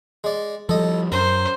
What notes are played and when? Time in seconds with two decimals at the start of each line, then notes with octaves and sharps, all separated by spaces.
0.24 G#3 D5
0.69 F3 G3 A4 D#5
1.12 F#2 A#4 C5